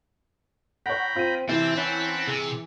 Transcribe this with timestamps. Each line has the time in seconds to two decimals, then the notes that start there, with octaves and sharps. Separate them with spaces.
0.86 C#5 F#5 G5 A#5 B5
1.16 C4 F4 D#7
1.49 C3 E3 C4 E4 A5
1.78 C#4 F#5 A5 B5
2.28 C3 G#4